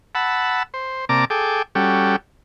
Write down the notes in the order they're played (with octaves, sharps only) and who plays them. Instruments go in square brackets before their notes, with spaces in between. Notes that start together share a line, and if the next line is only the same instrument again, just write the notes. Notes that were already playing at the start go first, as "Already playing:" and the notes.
[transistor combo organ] F#5 A5 B5 E6
C5
C3 A#3 D5 A5 A#5 D6
G#4 A4 G5 D6
G3 C#4 F#4 G4 A4